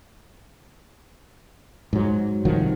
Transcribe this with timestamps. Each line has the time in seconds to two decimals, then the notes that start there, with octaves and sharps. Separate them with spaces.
1.93 G#2 F#3
2.45 C2 D#3 F3 F#3